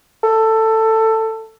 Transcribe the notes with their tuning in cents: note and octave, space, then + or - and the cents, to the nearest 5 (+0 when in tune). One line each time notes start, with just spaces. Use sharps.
A4 +15